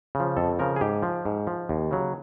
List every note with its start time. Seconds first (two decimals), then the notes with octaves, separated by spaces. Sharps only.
0.15 C#3
0.20 F3
0.37 F2 A4
0.59 C#3 F3 A#4
0.76 G#4
0.81 G#2 G4
1.03 F3
1.25 G#2
1.47 F3
1.69 D#2
1.91 C#3 F#3